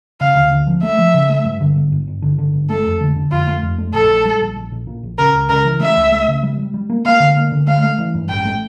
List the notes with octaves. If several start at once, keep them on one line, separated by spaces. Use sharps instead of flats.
C#3 F5
D2
D2
F3
A3 E5
F3
C#3
A3
G2
D3
G1
G1
G1
D3
D3
G1
A3 A4
F2
D3
D3
F2 F4
A3
F2
A3
A#1 A4
A#1
G3
A#1
A#1
A#1
A#2
A#1
C#3 A#4
C#2
C#3 A#4
E3
A3 E5
C#2
A3
C#3
G3
G3
G3
A#3
A#3 F5
D3
A#3
D3
A3 F5
A3
E3
G2
A1 G5
A3